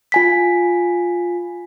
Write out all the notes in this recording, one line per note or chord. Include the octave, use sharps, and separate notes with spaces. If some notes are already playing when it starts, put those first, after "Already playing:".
F4 G#5 B6